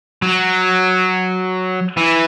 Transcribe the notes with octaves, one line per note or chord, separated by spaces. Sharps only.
F#3
E3